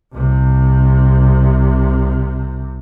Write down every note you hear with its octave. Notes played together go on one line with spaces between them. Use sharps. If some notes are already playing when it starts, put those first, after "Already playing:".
C2 C3